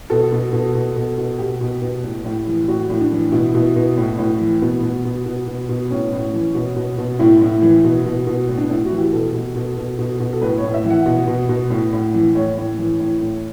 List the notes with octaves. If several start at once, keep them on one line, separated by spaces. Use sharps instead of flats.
B2 A4
B2
B2
B2
B2
B2
B2 G4
B2
B2
A2
A2
E3
A2 F#4
A2
D4
E3
B2 E4
B2
B2
A2
A2
E3
B2 B3
B2
B2
B2
B2
B2
A2 C#4
A2
E3
B2
B2
B2
A2 E4
A2
E3
B2
B2
B2
A2
D4
A2 E4
F#4
E3
G4
B2 A4
B2
B2
B2
B2
B2
A4
A2 B4
C#5
A2
E5
E3
F#5
B2 F#5
B2
B2
A2
A2
E3
A2 C#5
A2
E3
A2
A2